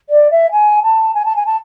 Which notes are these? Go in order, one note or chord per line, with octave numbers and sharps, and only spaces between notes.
D5
E5
G#5
A5
G#5
A5
G#5
A5